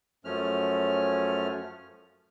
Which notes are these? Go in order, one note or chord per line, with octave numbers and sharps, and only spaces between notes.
F#2 F3 A3 C#4 F6